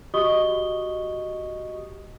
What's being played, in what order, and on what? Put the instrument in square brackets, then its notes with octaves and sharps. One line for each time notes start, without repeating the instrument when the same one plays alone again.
[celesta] F#4 G4 D#5 C#6 D#6 G7